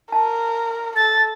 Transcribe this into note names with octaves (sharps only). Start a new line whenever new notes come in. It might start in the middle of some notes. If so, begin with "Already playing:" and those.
A#4 A5
A4 A6